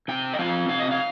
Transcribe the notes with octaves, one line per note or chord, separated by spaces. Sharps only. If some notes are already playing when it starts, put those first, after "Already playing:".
C3 G5
D#5
F3 C4 F4 F5
C3 F5
D#5
F5